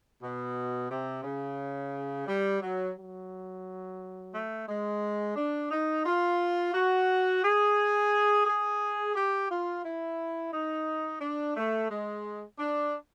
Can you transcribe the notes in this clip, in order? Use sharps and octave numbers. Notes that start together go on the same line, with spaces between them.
B2
C3
C#3
G3
F#3
F#3
A3
G#3
D4
D#4
F4
F#4
G#4
G#4
G4
F4
E4
D#4
D4
A3
G#3
D4